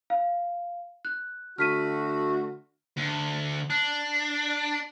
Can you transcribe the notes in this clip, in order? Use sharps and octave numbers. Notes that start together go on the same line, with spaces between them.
F5
F#6
D3 A3 F#4 F6 B6 D#7
D2
D4